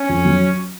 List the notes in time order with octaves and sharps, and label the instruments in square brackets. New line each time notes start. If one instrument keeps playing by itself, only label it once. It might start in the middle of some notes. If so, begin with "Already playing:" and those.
Already playing: [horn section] C#4
[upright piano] F2
F#3